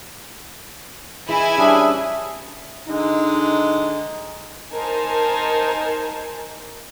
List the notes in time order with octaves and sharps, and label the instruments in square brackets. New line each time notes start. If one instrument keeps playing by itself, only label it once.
[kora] E3 D#4 G#4 [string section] E4 G#5
[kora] G3 [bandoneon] C#4 D4 G#4 [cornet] E5
[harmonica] D3 G#3 A#5 [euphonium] D#4
[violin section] D#4 A#4 C5 G#5 A5